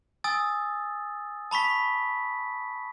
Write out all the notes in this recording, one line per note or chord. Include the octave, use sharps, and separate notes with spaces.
G#5 D#6 E6 A6
A5 B5 C#6 B6